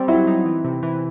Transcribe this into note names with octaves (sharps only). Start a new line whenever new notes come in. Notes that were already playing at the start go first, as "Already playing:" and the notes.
Already playing: G3 C4
F#3 E4
D#4
E3
C3
E3